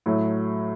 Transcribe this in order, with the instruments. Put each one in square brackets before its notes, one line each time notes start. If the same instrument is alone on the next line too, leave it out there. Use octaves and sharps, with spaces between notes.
[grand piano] A2 F#3 A3